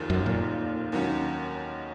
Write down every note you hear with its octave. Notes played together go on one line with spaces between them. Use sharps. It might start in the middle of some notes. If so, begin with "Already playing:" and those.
Already playing: F1 D#2 D#3 A#3 F4
F#2
A#2
D#2 D#3 F#3 A#3 C#4